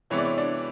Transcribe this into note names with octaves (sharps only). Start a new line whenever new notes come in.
C3 E3 G#3 B3 C#5
D5
C#5
D4 D5